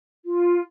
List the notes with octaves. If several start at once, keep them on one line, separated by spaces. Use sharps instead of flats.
F4